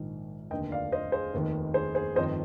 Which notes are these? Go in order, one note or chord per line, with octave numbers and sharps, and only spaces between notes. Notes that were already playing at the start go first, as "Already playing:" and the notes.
Already playing: A#1 G#2 D#3
F1 D#2 D3 D#5 G5
D5 F5
C5 D#5
G#4 C5
F1 D#2 D#3
G#4 C5
G#4 C5
G1 F2 D#3 C5 D#5